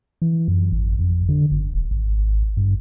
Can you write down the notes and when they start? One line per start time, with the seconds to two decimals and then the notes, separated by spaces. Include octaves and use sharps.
0.22 E3
0.48 F#2
0.72 G#1
0.99 F2
1.29 D3
1.51 G1
1.74 D#1
1.91 G#1
2.57 G2